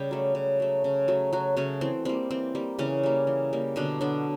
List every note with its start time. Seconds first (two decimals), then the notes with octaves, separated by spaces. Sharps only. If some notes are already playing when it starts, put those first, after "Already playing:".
Already playing: C#3 G3 G4
0.11 F#3 A3
0.35 C#3
0.60 F#3 A3
0.84 C#3
1.08 F#3 A3
1.33 C#3 F#3 F#4
1.57 C#3 F#3 A3 C#4
1.81 E3 C4
2.05 G3 A#3 C4
2.31 E3 C4
2.55 G3 A#3
2.79 C#3 E3 C#4
3.03 G3 A#3
3.27 E3
3.53 G3 A#3
3.76 B2 D3 D4
4.01 D3 F#3 B3 D4